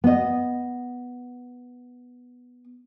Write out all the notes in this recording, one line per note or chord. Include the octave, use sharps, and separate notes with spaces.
B3 D#5